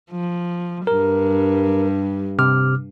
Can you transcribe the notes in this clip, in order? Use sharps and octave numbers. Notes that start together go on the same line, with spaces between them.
F3
G2 G3 A#4
C3 D6 F6